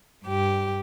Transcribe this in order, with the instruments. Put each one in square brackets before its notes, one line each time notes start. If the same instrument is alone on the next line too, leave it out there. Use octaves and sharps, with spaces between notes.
[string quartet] G2 G4